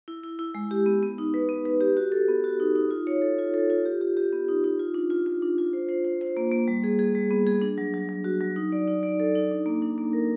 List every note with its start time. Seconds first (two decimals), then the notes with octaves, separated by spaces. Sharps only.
0.08 E4
0.24 E4
0.39 E4
0.55 G#3
0.71 G4
0.86 B3
1.03 B3
1.18 D#4
1.34 B4
1.49 B3
1.65 B4
1.81 G4
1.97 F#4
2.12 A4
2.28 B3
2.44 F#4
2.60 D#4
2.76 D#4
2.91 F4
3.07 C#5
3.22 A4
3.38 F4
3.54 A4
3.70 F4
3.86 G4
4.01 G4
4.17 G4
4.33 B3
4.48 D#4
4.64 D#4
4.79 F4
4.94 D4
5.10 F4
5.26 F4
5.42 D4
5.58 F4
5.73 C5
5.89 C5
6.04 C5
6.21 C5
6.37 A#3
6.52 A#3
6.68 G3
6.84 G#4
6.99 G#4
7.15 G3
7.31 B3
7.47 G#4
7.62 D4
7.78 F#3
7.94 F#3
8.09 F#3
8.24 F#4
8.41 F#3
8.56 D#4
8.72 D5
8.87 D#4
9.03 D5
9.20 A4
9.36 D#4
9.51 D4
9.66 A#3
9.82 D4
9.98 A#3
10.13 A#4